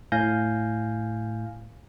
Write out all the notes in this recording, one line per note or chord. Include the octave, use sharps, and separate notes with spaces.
A2 F5 G#5 G6 A#6